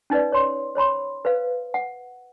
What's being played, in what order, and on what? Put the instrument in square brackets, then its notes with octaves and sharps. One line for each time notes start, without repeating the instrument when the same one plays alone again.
[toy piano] C#4 D#4 B4 D5
C#5 C6
C5 C#5 B5 C6
B4 C5 F5
F#5